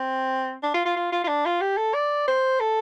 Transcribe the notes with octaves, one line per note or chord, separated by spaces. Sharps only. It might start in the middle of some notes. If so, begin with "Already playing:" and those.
Already playing: C4
D4
F4
F4
F4
F4
F4
D4
F4
G4
A4
D5
C5
A4